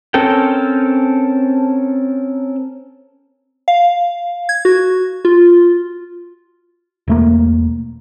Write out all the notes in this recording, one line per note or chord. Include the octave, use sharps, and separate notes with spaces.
C4 C#4 A4 A#4 G5
F5
G#6
F#4
F4
E1 A3 A#3